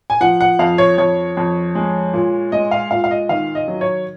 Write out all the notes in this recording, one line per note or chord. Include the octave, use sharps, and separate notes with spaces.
G#5
F3 F#5
F#5
F2 F5
C#5
F2 C#5
F2
G#3
A#2
G#3 D#5
F5
A#2 F5
F5
D#5
D#3 F5
D#5
F#3
C#5